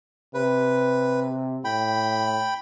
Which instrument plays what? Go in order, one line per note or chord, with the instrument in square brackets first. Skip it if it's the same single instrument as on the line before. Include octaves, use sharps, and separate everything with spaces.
[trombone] C3 [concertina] B4
[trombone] A2 [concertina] G5 B5